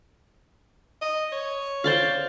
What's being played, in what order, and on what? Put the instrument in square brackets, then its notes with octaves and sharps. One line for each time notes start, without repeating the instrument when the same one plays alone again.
[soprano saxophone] D#5
C#5
[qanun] C5 D5 F5